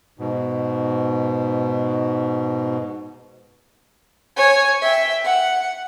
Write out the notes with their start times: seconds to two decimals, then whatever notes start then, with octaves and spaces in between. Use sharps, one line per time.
0.19 G#2 B2
4.36 C#5 G#5
4.81 E5 G5
5.24 F#5